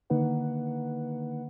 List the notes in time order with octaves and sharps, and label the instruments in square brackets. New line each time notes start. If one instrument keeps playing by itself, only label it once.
[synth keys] D3 D#3 A#3 D#4 B4 F#5